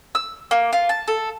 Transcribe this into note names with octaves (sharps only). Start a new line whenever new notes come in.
E6
A#3
F4
A5
A4